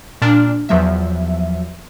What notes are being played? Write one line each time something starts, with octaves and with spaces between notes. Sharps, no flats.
A#2 D4 F6
E2 F3 F#3 E5